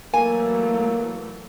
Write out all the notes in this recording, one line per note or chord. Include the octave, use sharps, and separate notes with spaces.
E3 F#3 A3 A#3 G#5